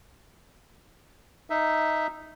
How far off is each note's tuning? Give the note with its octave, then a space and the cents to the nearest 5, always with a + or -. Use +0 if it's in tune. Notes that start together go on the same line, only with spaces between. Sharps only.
D#4 +0 E5 +0